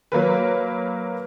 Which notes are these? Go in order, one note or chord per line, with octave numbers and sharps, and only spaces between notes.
F#3 A#3 A#4 B4